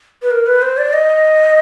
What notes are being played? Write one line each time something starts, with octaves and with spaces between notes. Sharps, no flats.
B4
A#4
B4
C5
D5
D#5